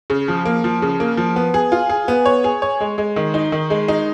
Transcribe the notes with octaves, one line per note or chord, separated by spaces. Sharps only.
C#3
F3
A#3
F3
C#3
A#3
F3
B3
G#4
F4
G#4
B3
C#5
G#4
C#5
G#3
G#3
D#3
D#4
D#3
G#3
D#4